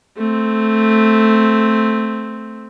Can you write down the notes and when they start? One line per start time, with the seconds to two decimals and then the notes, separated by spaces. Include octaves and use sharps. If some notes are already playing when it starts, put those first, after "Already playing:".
0.17 A3 C4